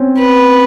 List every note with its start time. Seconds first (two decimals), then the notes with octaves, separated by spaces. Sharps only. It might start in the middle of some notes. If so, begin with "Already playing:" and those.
Already playing: C4 C#4
0.18 B4